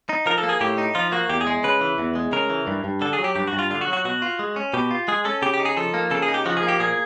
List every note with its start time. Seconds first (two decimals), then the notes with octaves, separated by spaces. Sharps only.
0.09 D#4
0.26 F3 A#4
0.38 A4
0.43 A#3
0.49 G#4
0.61 A2 G4
0.78 D#4
0.95 F3 F4
1.12 A#3 F#4
1.29 E2 G4
1.41 G#4
1.47 G#3
1.64 C#3 B4
1.81 E3
1.98 E2
2.15 G#3
2.32 C#3 A#4
2.50 E3
2.67 G2
2.84 G2
3.01 D3 A4
3.13 G#4
3.19 F#3
3.24 G4
3.36 G2 G4
3.47 F#4
3.53 G2
3.59 F4
3.71 D3 F4
3.81 F#4
3.88 F#3
3.93 F#4
4.05 B2 F#4
4.22 F4
4.39 G#3
4.56 C#4
4.74 B2 G4
4.91 F4
5.08 G#3 G#4
5.25 C#4 A4
5.42 C#3 G4
5.54 G4
5.60 D#4
5.65 G#4
5.77 F3 A4
5.94 A#3
6.11 C#3 A4
6.22 G#4
6.28 D#4
6.34 G4
6.45 F3 F#4
6.57 G#4
6.63 A#3
6.69 G4
6.80 A#2 G#4